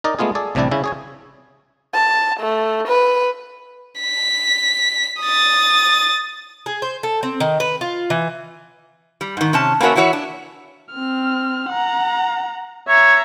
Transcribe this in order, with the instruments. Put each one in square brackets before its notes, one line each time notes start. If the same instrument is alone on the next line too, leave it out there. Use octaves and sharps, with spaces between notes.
[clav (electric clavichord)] D#4 A#4 D5 D#5
G#3 A3 B3 F4 G#4
G#4 A4 D5
A1 C3 G3 D4 E4 D5
C#3 C#4 E4
G#4 C#5 G#5
[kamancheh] A5
A3
B4
[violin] B6
D#6 A6
[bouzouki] G#4
C5
A4
C4
D#3
B4
F4
E3
[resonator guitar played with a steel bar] G3
G#2 D#3
C3 C#4 A5
A#3 B3 C#4 F#4 A#4 E5
E3 E4 F#4 C#5 E5
D4
[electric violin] C4 F6
F#5 A#5
[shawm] C#5 [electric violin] E5 A#5